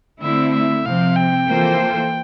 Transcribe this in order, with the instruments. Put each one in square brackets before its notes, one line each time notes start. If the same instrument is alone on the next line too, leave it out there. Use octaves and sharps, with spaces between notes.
[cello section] D3 A3 C4 E4 [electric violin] E5
[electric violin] E5
[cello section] C3 F3 C4 [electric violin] F5
[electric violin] G5
[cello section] E3 A#3 F4 A4 C5